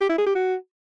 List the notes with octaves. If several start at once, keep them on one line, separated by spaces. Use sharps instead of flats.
G4
E4
G#4
G4
F#4